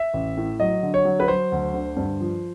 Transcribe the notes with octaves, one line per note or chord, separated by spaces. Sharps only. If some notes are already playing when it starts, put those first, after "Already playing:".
Already playing: E5
A1
A2
F#3 D#5
D3
C#5
F#3
B4
F#3 C5
D2
D3
G2
F3